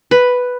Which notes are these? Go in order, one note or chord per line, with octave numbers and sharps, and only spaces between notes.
B4